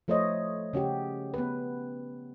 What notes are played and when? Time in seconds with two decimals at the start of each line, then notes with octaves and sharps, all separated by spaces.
0.08 F3 A3 C5 C#5 D#5
0.73 C#3 C#4 F#4 G4
1.34 B3 B4